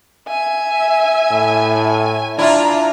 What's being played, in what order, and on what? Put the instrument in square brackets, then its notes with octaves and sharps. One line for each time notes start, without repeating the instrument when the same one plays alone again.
[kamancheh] E5 G#5
[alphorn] A2
[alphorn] D4 [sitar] E4 F4 [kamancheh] A#5